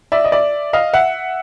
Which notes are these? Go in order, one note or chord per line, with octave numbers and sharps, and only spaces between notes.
D5 E5
D#5
D5 E5
D#5 F5
E5 F#5